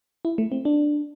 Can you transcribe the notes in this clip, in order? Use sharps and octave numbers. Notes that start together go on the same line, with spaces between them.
E4
A3
C4
D4